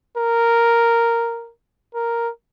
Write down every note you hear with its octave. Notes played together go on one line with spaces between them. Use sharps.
A#4
A#4